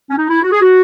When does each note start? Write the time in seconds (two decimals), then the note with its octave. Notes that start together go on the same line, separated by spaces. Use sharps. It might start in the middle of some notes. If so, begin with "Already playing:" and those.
0.10 C#4
0.18 D#4
0.30 E4
0.43 F#4
0.52 G#4
0.61 F#4